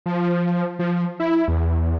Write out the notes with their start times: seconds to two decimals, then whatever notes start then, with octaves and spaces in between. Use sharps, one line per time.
0.06 F3
0.79 F3
1.20 E4
1.48 E2